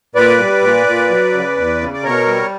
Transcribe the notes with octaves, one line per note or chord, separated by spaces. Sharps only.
A#2 B4 D5
G3
A#2
A#2
F#3
C#3
E2
C#3
D5
B2 A#4 C#5
G3